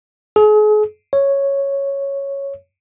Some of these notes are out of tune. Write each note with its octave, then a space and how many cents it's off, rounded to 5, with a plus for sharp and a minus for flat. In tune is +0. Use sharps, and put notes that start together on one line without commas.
G#4 +40
C#5 -5